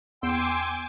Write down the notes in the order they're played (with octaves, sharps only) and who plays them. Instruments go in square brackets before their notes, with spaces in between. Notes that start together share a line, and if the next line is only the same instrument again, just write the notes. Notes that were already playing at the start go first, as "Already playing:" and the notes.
[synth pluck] E2 B3 [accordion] G5 C6 E6 [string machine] G#5 D6